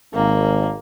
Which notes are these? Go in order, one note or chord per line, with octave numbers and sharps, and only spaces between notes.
G#1 A#3